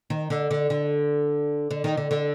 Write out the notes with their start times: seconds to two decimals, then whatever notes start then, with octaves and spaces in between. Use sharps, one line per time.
0.10 D#3
0.30 D3
0.51 D3
0.70 D3
1.71 D3
1.84 D#3
1.97 D3
2.11 D3